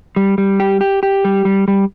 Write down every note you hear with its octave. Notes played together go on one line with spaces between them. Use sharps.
G3
G3
G4
G4
G4
G3
G3
G3